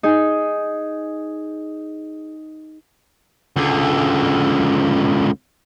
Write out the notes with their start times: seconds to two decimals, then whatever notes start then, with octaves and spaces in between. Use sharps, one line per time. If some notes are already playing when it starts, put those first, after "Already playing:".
0.03 D#4 G#4
3.57 C#2 D3